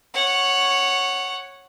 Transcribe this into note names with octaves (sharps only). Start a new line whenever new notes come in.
C#5 F#5